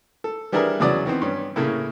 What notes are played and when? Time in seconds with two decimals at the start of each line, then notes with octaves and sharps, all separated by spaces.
0.24 A4
0.52 E3 G3 D4 E4 G#4 A#4
0.80 E2 C#3 F#3 D5 D#6
1.06 D#3 E3 B3 C4
1.22 G2 C#4
1.56 A2 C#3 A3 A#3